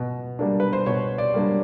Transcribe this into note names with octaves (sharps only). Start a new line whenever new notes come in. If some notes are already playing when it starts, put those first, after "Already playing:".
Already playing: B2
G3 A#3 D4
B4
C5
B2 C#5
D5
G3 A#3 D4